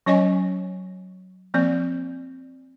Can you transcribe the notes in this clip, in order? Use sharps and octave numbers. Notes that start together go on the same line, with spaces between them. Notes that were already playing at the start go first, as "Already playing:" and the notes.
F#3 C#4 C#5 D#5 G#5 C#6
F3 A#3 C4 D5